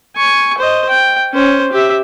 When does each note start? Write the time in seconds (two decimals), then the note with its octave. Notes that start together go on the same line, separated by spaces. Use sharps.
0.17 G#5 C#6
0.58 C5 D#5
0.89 G5
1.34 C#4 C5
1.72 G4 E5